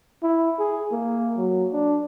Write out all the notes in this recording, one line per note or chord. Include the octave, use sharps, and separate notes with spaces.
E4
G#4
A#3
F#3
D4